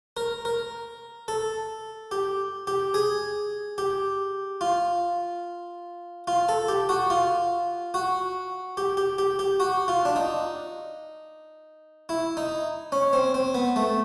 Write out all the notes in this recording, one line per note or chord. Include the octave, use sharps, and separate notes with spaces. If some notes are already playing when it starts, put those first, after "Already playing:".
A#4
A#4
A4
G4
G4
G#4
G4
F4
F4
A4
G4
F#4
F4
F#4
G4
G4
G4
G4
F#4
F4
D4
D#4
E4
D#4
C#4
C4
C4
B3
A3